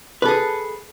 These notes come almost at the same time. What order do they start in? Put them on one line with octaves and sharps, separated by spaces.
B4 A4 G#4